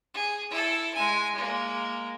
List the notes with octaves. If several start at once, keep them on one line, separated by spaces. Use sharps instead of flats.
G#4
E4 A4
G#3 G#5
G#3 A#3